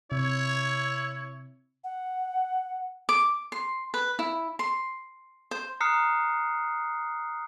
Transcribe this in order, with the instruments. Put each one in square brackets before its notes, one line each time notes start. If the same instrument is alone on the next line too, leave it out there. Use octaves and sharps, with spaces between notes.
[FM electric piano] C3 [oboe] E4 [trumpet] C#5
[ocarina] F#5
[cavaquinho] D6
C6
B4
E4
C6
C5
[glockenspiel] A#5 D#6 F6 F#6 C7 C#7